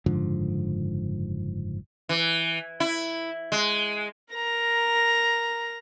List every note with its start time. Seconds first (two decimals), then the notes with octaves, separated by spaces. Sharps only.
0.06 F#1 G#2 D3 F3
2.09 E3
2.80 E4
3.52 G#3
4.33 A#4 A#5